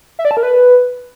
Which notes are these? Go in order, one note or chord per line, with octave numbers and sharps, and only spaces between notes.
E5
D5
A5
A#4
B4